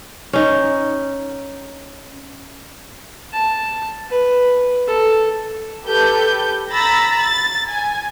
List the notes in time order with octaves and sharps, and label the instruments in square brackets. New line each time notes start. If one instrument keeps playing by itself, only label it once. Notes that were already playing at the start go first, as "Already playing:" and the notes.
[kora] C#4 D#4
[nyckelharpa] A5
B4
A4
[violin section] G4 A4 B4 G6
A#5 B5 E6 A6 A#6
A6
G#5